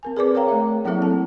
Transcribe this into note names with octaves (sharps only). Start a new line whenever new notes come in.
C4 A#4 G#5
G#4 B4 D5 D6
A#4 C#5 F5 G5 A#5
A3 E5
F#3 A#3 C4 E4 A4 E5
A5